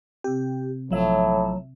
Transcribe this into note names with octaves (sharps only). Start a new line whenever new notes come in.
C3 C4 G4
A#1 A2 F3 F#3 E5